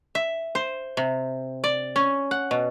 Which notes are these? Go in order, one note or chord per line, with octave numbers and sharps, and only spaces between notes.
E5
C5
C3
D5
C#4
F#5
B2